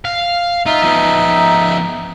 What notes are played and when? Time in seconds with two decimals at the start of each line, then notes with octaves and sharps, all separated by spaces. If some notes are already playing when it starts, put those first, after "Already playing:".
0.05 F5
0.66 D#4 F4 E5
0.82 F3 B3